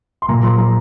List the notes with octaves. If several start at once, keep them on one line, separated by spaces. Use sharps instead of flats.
C6
A#2 A#5
F3 C6
F3 A#5